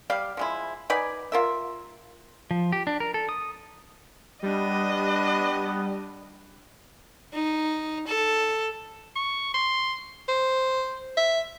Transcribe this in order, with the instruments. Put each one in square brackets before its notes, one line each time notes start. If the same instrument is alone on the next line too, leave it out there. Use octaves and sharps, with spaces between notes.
[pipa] G3 G4 D5 F5
F3 G#3 E4
D#4 B4 D5 G#5
F4 A#4 E5
[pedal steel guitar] F3
G4
D4
A#4
A4
D#6
[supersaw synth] G3 [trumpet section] B3 [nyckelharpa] D4 [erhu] D#5
[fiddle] D#4
A4
[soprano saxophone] C#6
C6
C5
E5